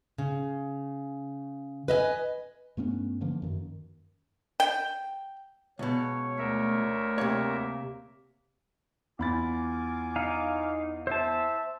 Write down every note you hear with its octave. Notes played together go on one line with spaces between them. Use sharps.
C#3
B4 D#5 E5 G#5
G2 A3 B3 C#4
D3 E3 F3 A#3
F#2 D#3
G5
C#2 B2 C#5
D2 A3 A#4 E5
C3 A#3 C#5
E2 F4 G#5 B5 D6 A6
D#4 F5
C5 E5 A5